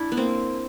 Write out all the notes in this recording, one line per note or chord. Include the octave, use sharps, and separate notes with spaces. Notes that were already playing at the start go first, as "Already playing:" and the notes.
Already playing: D4 E4
B3
A#3 C4